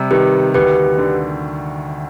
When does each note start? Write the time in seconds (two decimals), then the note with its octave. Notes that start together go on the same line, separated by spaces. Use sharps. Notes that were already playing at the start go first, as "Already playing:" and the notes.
Already playing: C3 G3
0.11 D#3 G4 B4
0.54 D2 G4 B4
0.98 D3